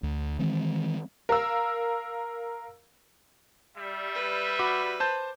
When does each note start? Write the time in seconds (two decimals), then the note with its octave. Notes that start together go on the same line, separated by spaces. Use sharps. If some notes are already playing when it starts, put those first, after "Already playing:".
0.03 D2
0.39 D#3 E3 G#3 C4
1.29 A#4 F5 E6
3.77 G3 E5
4.15 B4
4.59 F#4 B5 D6
5.00 C5 A5 G6